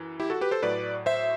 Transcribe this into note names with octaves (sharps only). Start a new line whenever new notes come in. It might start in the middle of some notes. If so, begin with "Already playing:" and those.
Already playing: F#2 E3
E4 G4
F#4 A4
G4 B4
A4 C5
A2 F#3 A3 B4 D5
C5 E5